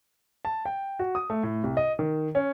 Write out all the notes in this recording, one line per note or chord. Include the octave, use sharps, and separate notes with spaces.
A5
G5
F#4
D#6
A3
A2
C2
D#5
D#3
C#4